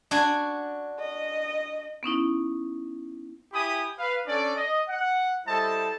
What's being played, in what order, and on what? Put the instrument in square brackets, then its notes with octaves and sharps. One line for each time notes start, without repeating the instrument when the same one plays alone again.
[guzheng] D4 F#4 G#5
[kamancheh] D#5
[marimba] B3 C#4 D#4 E4
[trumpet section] E4 G4 G#5 B5 D#6
B4 F5
C#4 D4 A4 D5
D#5
F#5
G3 E4 A4 C5 D#5 A5